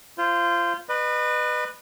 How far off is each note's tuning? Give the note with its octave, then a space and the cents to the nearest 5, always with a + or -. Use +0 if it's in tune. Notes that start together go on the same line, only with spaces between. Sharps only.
F4 -20 C5 +0
B4 +0 D#5 -40